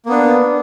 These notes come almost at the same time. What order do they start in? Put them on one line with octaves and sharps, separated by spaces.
A#3 B3 D4